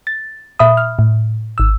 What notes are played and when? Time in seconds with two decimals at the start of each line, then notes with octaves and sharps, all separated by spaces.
0.07 A6
0.59 A#2 E5 B5 D#6
0.77 F6
0.99 A2
1.58 G#1 E6